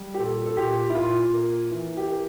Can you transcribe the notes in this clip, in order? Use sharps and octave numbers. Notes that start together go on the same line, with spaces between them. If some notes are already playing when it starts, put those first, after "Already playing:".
Already playing: G3
G4
A#2 A4
A4
A#2 G4
E4
A#2 F4
A#3
E3
G4
A#3